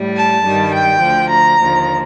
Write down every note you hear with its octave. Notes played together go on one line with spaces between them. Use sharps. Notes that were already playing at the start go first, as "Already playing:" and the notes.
Already playing: A2 G3
A5
G2 D#3 G3
G5
D2 D3 F3
A#5
D#2 D3 F3